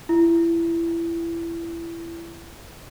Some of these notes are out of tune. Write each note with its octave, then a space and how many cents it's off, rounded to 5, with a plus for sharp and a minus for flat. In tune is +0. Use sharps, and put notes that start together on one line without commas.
E4 +25